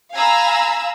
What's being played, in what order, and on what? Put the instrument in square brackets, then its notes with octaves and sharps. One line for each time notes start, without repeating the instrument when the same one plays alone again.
[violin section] F5 G#5 A#5 B5 E6